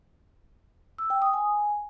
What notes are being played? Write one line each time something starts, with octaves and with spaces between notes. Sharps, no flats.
E6
G5
D#6
G#5